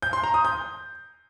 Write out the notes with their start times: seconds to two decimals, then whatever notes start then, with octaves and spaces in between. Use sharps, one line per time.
0.02 G6
0.13 C6
0.24 A#5
0.34 D#6
0.45 G6